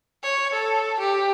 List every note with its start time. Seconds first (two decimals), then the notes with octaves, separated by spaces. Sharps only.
0.23 C#5
0.53 A4
1.00 G4